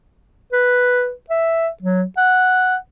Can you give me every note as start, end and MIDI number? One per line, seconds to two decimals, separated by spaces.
0.53 1.12 71
1.30 1.68 76
1.82 2.04 54
2.17 2.76 78